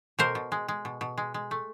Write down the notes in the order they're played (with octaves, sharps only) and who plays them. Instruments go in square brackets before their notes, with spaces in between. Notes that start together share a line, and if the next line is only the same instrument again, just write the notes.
[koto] B2 A#4 C5
B2
G#3
G#3
B2
B2
G#3
G#3
A3